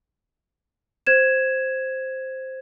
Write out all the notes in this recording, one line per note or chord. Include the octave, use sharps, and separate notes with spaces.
C5 G#6 E7